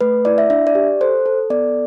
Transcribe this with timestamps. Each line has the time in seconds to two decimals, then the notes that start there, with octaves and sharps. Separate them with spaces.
0.01 A3 B4
0.25 E4 D5
0.38 E5
0.50 D4 E5
0.67 D5
0.75 G4
1.01 A4 C5
1.26 A4
1.50 B3 D5